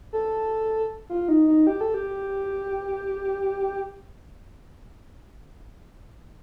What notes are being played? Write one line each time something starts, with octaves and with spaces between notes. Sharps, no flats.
A4
F4
D#4
D#4
G4
A4
G4